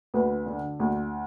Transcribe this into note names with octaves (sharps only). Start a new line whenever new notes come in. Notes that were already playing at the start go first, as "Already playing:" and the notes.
D2 B4
D3
D2